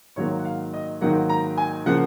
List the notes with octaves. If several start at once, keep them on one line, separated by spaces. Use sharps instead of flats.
G#2 D#3 F#3 A#3 C#5
F#5
F5
D#5
G#2 D#3 F#3 A#3 F#5
A#5
G#5
C#3 F3 A#3 F#5